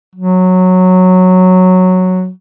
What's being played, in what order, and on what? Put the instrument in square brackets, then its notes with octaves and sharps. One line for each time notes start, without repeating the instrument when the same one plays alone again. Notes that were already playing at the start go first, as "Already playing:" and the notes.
[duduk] F#3